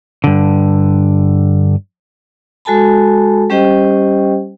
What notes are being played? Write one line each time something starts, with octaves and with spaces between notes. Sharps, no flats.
G2 D3
G#3 F#4 A4 G#5 A5 B5
G3 C#4 G4 C5 D#5 G5